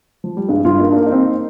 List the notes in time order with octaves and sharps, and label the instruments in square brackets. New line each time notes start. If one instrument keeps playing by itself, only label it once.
[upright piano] F3
G3
[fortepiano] G2 [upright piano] G#3
[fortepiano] G2 [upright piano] F4
[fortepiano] A#3 [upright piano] D#4
[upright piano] D4
[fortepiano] A#3
[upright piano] D#4
[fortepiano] C4